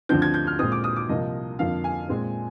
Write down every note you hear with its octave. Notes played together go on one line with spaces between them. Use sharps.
D2 D3 F3 C4 G6
G#6
G6
F6
A#2 G#3 C4 D#6
D6
D#6
D6
C2 C3 F3 A#3 D#5
F2 D3 F3 A#3 F5
G#5
A#2 G#3 C4